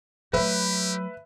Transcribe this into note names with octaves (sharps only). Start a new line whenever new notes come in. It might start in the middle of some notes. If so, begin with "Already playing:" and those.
F#3 A3 G4 B4 E5